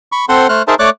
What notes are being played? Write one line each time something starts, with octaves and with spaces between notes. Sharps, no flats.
B5 C#6
C4 A4 C5 F#5 C6
A3 C5 F6 F#6
D#4 G#4 A#4 C5 E5 A5
A3 C#5 D5 D6 F#6